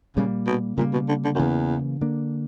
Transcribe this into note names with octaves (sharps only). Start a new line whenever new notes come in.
A#2 C#3 G3 A#3
B2
A#2 C#3 G3 A#3
B2
D3
D3
F#2
E2 C#3 E3 A#3
D3 A#3 D4